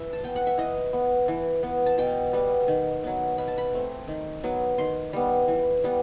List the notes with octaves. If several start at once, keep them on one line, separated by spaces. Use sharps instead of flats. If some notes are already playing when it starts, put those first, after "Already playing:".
Already playing: E3 E5
A5
B3 G5
F#5
E5
E3 D#5
B3
E3
B3
A5
B2 G5
G3 B3
D#3
F#3 B3
B2 B5
A5
B5
A3 C4
D#3
F#3 B3
D#3 C6
G3 B3
E3
G3 B3